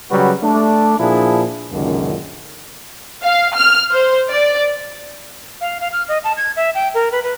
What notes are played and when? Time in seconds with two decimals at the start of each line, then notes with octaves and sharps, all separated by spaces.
0.10 C#3 F#3 G3 F#4 B4
0.43 A3 D4
0.99 A#2 F3 D4 E4 G#4
1.72 C#2 F#2 A#2 D3 D#3
3.23 F5
3.55 F6
3.91 C5
4.30 D5
5.61 F5
5.81 F5
5.92 F6
6.08 D#5
6.24 A5
6.37 G#6
6.56 E5
6.75 G5
6.94 A#4
7.12 B4
7.23 B4